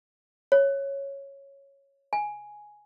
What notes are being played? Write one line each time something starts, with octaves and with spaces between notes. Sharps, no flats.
C#5
G#5